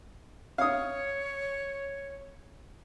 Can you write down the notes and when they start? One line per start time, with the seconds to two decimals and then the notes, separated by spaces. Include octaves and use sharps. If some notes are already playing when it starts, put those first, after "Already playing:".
0.58 C#5 F5 D#6